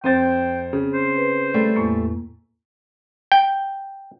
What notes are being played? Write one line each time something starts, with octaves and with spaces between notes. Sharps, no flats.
F2 C4 C5 G5 A6
C#3
C5
B4
G3 A3
E2 A2 A#3
G5